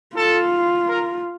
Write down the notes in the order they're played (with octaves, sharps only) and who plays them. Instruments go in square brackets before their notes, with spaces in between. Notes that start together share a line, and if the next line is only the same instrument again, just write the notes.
[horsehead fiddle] F4 [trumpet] A4
[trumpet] A#4